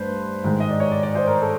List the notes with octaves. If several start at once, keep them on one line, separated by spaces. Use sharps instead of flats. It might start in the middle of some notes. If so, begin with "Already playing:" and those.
Already playing: G2 A3 B4 C5
G#2 D#3 G#3
D#5
D5
C#5
D5
D5
C5
A#4
A4